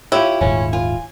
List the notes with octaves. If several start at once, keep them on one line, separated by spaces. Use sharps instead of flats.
E4 F4 G4 C#5
D#1 G#2 G#3 C#4
F4 G#5